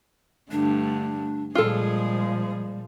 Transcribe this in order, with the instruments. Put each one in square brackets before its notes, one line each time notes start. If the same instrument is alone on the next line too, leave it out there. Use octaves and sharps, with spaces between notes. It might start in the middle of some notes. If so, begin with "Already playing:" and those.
[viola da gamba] G2 D3 [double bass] A3 [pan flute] D4
[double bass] A#2 F3 [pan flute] G3 [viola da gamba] G#3 G#4 [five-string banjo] F4 A4